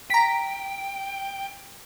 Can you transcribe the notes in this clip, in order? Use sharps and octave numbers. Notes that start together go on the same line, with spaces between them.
G5 A#5 B6